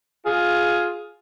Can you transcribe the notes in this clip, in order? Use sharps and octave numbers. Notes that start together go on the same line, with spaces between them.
F4 G#4